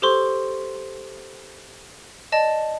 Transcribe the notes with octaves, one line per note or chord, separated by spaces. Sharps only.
G4 A4 C5 C6 C#6
D5 D#5 A5